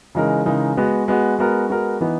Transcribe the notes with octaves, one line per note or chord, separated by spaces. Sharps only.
C#3 E3 G#3 D#4 A#4
C#3 E3 G#3 D#4 A#4
G#3 B3 F#4
G#3 B3 F#4
G#3 B3 F#4 A#4
G#3 B3 F#4 A#4
E3 B3 D#4